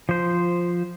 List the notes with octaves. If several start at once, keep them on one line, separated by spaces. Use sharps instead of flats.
F3 C5